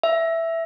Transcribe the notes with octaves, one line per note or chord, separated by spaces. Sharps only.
E5